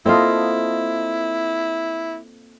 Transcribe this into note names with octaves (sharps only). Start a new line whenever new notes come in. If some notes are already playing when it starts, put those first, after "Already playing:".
A#3 C4 E4 F4 A4 D#5